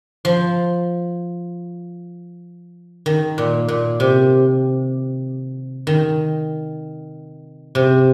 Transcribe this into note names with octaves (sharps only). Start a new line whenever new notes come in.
F3
D#3
A#2
A#2
C3
D#3
C3